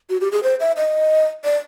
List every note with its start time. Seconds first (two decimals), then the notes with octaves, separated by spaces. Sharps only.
0.10 F#4
0.21 G4
0.32 G#4
0.43 C5
0.60 E5
0.77 D#5
1.44 D5